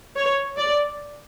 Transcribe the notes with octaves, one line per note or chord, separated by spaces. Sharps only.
C#5
D5